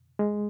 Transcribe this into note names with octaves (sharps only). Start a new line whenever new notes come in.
G#3